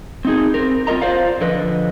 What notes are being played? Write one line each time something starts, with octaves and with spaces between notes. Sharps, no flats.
C4 D#4 G#4
C4 A#4
C4 F4 A#4 D#5 A#5
F4 C5 D5 F5
D3 F3 B4 D#5